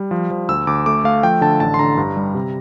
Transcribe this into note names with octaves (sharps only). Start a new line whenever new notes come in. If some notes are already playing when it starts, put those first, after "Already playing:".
Already playing: G3
F3
F3
D2 E6
D2 D6
A3 D6
A3 F5
F3 G5
D3 A5
A1 A5
C6
D3 A#5
G2
G3
C3